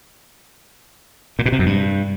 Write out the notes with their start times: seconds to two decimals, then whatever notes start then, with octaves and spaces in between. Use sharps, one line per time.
1.39 A#2
1.46 B2
1.52 C3
1.59 F#2
1.66 G2